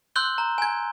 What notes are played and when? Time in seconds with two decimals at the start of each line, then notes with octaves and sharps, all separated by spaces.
0.16 C6 E6 F#6 G6 G7
0.38 A#5
0.58 G#5 G#6